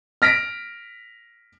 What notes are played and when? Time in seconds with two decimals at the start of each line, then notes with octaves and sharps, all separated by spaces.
0.22 F6 A#6 B6 D7